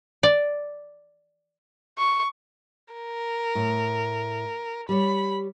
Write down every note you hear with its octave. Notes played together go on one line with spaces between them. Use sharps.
D5
C#6
A#4
A2
G3 C#5 B5